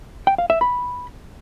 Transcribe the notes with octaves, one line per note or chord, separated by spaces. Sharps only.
G5
F5
E5
B5